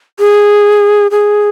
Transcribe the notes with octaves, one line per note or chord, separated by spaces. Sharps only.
G#4
G#4